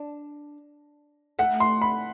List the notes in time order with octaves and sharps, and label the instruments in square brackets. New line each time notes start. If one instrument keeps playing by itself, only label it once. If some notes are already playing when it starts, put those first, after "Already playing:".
Already playing: [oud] D4
[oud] A3 [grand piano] F#5
[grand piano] C6
B5